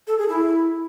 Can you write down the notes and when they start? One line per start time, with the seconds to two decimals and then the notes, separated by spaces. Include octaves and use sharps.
0.07 A4
0.18 G#4
0.29 E4